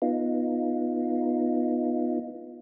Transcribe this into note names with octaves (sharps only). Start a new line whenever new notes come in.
B3 D#4 F4